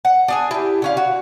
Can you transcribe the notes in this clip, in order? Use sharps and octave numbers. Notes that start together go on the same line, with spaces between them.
F#5
D4 G#4 G#5
E4 G4
D3 C#4 F5
F#4